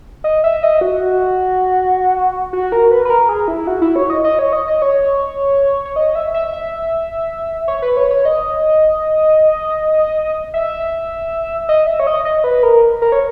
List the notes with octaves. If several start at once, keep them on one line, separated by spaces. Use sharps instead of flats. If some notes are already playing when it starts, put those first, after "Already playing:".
D#5
E5
D#5
F#4
F#4
A#4
B4
B4
A#4
G#4
E4
F#4
E4
C#5
D#5
D#5
C#5
D#5
D#5
C#5
C#5
D#5
E5
E5
E5
C#5
B4
C#5
C#5
D#5
E5
D#5
E5
C#5
D#5
D#5
B4
A#4
A#4
C#5